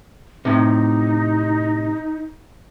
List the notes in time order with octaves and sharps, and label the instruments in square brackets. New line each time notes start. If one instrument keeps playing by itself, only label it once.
[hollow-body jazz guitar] A2 C3 [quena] D#4